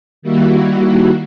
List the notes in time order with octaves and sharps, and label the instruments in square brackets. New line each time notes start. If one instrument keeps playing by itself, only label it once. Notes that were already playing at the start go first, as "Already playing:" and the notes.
[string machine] D#3 G3 A#3 E4 F#4